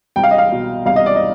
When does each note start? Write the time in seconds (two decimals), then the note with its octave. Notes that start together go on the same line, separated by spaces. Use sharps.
0.16 C2 G5
0.24 F5
0.31 D#5
0.38 F5
0.52 B2
0.86 C2 F5
0.96 D#5
1.06 D5
1.16 D#5